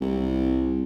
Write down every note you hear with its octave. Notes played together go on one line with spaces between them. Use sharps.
C2